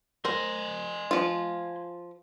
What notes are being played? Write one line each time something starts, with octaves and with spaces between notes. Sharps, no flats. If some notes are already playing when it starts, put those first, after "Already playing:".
A#4 C5 G#5 C6
F3 F4